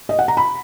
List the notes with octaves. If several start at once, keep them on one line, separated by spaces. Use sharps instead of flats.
D#5
F#5
A#5
B5